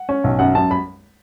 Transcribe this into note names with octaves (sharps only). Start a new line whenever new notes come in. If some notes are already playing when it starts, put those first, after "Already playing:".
Already playing: F#5
C#4
B1
F#2 F#5
F#2 A5
B5